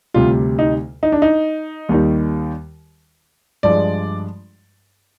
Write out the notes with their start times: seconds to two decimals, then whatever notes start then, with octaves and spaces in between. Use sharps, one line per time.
0.14 D2 C3 G3 F4
0.59 D#4
1.03 D#4
1.12 D4
1.22 D#4
1.89 D#2 D#3 G3
3.63 G2 F3 G#3 D5